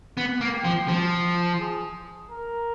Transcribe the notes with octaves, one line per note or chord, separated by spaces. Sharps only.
B3
A#3
G4
F3
F3
G#4
A#4